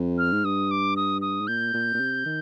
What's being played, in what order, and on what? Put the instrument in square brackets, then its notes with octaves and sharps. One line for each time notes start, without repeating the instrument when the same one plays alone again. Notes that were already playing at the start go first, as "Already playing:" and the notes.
Already playing: [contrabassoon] F2
[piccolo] F6
[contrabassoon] G#2
[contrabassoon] G2 [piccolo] D#6
[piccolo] D6
D#6
D#6
[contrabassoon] G#2
[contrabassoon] A#2 [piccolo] G6
[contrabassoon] A#2
A#2
C3
D#3